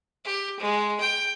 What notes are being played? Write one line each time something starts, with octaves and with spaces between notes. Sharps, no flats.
G4
G#3
G5